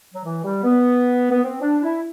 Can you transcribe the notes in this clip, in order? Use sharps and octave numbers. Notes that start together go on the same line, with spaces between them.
F#3
E3
G3
B3
B3
C4
D4
E4